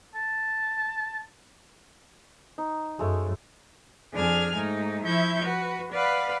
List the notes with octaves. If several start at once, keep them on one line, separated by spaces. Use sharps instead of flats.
A5
D#4
F#2 G#3 A3 C#5
F2 D4 G#4 G#5 F6
G#2 A3 D#4
F3 E4 E5 C#6 G6 G#6
F#4 B4
B4 D5 F5 F#5 B5